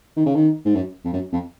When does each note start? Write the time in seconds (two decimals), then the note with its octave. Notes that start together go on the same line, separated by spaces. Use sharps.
0.17 D#3
0.26 C#3
0.35 D#3
0.65 G#2
0.75 F#2
1.05 F2
1.13 F#2
1.32 F2